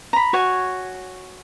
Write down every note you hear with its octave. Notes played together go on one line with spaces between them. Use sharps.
A#5 B5
F#4 C#5 G#5